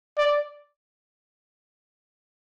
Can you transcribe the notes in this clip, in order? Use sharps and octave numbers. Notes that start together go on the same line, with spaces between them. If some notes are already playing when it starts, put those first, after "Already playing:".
D5